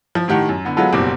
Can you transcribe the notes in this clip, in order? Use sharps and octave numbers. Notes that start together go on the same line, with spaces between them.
F3
A2 D#3 G4 F#5 A5
F#2
D3 B3
F#3 G#3 B3 F4 A4
F#1 B2 G3 C4 D6